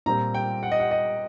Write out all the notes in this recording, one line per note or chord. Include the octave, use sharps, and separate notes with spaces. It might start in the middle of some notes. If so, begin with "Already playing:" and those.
A#2 G3 C4 A#5
G5
F#5
D#5
F#5
D#5